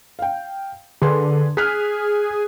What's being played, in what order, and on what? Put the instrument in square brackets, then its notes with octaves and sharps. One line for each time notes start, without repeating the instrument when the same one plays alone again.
[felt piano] F5 G5
[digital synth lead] D3 [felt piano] G#4 B4 C6
[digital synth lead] G#4 [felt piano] F6 F#6 B6